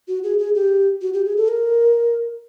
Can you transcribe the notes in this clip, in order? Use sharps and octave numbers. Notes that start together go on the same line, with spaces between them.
F#4
G#4
G#4
G4
F#4
G4
G#4
A4
A#4